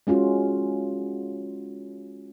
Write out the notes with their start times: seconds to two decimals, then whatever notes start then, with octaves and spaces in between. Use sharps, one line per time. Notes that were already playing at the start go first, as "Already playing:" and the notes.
0.07 G#3 C#4 F4 F#4